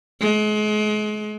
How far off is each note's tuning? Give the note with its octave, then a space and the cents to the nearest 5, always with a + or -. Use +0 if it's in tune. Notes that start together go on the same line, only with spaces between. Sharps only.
G#3 +35